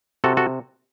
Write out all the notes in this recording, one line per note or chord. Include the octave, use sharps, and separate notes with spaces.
C3 F#4 A4
F#4 A4